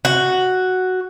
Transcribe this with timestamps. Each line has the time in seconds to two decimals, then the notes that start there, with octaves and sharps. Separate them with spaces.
0.05 F#4